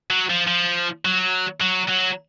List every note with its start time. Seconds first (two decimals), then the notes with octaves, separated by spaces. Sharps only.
0.11 F#3
0.30 F3
0.48 F3
1.05 F#3
1.61 F#3
1.89 F#3